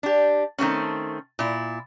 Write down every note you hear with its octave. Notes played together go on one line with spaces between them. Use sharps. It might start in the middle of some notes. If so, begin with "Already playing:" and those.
D4 G4
D#3 A3 C4 C#4
A#2 E4